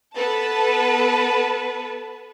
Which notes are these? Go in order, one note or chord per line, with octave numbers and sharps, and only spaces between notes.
B3 A4 B4 A5